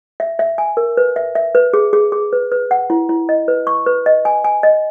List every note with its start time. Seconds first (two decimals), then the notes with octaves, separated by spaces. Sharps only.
0.20 E5
0.39 E5
0.58 G#5
0.77 A#4
0.97 B4
1.16 E5
1.35 E5
1.55 B4
1.73 G#4
1.93 G#4
2.12 G#4
2.33 B4
2.52 B4
2.71 F#5
2.90 E4
3.09 E4
3.29 D#5
3.48 B4
3.67 C#6
3.86 B4
4.06 D#5
4.25 G#5
4.44 G#5
4.63 D#5